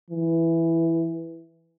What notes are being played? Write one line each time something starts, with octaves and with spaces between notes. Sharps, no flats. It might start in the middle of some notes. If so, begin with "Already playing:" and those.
E3